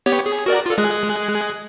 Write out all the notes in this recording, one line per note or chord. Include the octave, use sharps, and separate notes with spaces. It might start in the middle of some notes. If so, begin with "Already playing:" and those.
B3 G4 C#5
G#4
F#4 A#4 D5
F4 A4
G#3 G#4 F#6